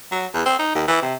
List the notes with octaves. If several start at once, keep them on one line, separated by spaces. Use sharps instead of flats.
F#3
E2
C4
D#4
D#2
E3
C3